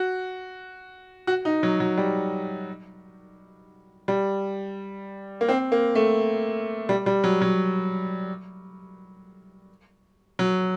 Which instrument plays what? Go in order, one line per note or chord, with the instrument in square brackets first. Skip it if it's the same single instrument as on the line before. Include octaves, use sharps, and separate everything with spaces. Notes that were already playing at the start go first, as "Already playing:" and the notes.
Already playing: [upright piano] F#4
F#4
D#4
F#3
F#3
G3
G3
A#3
C4
A#3
A3
G3
G3
F#3
F#3
F#3